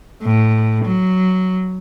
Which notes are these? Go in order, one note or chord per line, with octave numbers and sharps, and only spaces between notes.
A2
F#3